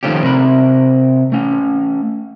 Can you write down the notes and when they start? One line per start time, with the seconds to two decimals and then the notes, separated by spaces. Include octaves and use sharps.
0.03 D#3 F3 A3 C#4 G4
0.23 C3 A#4 B5
1.32 A3 C#4